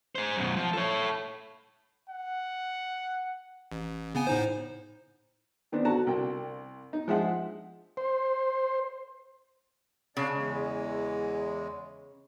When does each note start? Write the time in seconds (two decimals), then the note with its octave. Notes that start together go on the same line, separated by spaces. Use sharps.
0.15 G#4 C5
0.37 F#2 B2
0.57 F3
0.73 A4 C#5
2.10 F#5
3.72 A1
4.15 C#3 B3 G#5
4.27 A2 D#4 C5
5.72 D#3 B3 C4 D4
5.85 D3 F#4 A5 A#5
6.07 C2 G5
6.93 D#4
7.08 F3 G#3 E5 F#5
7.97 C5
10.17 C#3 D4 D5 F5
10.34 E2 G#3